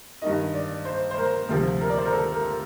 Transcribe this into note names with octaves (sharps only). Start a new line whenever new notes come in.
G2 D#3 D#5
D5
C5
C5
A#4
D2 C3 F3
A#4
D5
C5
A#4
A4
A#4